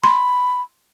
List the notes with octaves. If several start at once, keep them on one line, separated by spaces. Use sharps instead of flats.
B5 C6